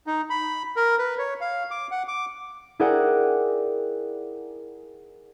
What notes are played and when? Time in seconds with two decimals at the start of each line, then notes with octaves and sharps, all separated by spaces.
0.07 D#4
0.30 B5
0.76 A#4
0.98 B4
1.18 C#5
1.41 F5
1.71 D6
1.91 F#5
2.08 D6
2.79 E4 G#4 A#4 D5 F#5 G5